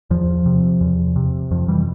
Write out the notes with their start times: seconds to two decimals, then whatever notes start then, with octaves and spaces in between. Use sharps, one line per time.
0.10 E2 F3
0.46 C3
0.81 E2
1.16 C3
1.51 F2 F3
1.68 E3 G3